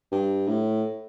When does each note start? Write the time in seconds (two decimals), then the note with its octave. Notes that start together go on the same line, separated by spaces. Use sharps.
0.12 G2
0.47 A2